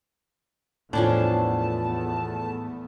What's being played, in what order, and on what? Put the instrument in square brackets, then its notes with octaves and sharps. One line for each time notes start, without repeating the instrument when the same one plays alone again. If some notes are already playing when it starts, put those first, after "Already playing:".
[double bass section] E2 A3 B3 [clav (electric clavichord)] A2 [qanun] F3 C#4 D4 [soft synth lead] A5